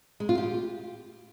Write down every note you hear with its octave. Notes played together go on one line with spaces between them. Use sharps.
G#3
F4
G4